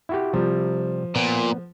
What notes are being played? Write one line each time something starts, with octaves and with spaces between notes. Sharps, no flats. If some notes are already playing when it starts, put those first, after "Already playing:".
E4 F#4 G4
C3 F3 G3
A#2 B3